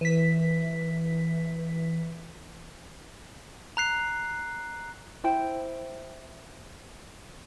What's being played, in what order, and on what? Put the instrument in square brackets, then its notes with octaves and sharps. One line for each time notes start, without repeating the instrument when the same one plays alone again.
[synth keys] E3 B6
[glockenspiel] A#5 F#6 C7
[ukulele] E4 C5 G5